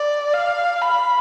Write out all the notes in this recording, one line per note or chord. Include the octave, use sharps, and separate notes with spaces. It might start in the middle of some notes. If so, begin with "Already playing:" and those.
Already playing: D5
F5
B5